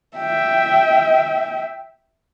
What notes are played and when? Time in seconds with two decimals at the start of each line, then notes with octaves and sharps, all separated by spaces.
0.18 E5 G5